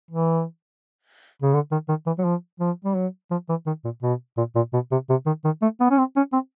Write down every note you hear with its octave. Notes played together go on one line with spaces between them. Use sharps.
E3
C#3
D3
D#3
D#3
E3
F#3
F3
F3
G3
F#3
F3
E3
D#3
A#2
B2
A#2
A#2
B2
C3
C3
D#3
D#3
A3
B3
C#4
C4
C#4
C4